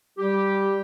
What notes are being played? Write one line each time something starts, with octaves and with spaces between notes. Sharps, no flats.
G3 G4